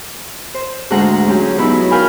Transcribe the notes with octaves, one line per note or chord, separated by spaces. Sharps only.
C5
D2 G#2 G#3 F#5 A#5
F#3 C#4 G4 G#4
B2 F#3 D#4 E4 B5
A#4 F5 G5 G#5 B5